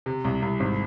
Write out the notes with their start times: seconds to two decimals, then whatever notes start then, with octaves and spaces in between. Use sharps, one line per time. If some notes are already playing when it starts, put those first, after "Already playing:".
0.06 C3
0.24 C2
0.42 C2
0.60 G#1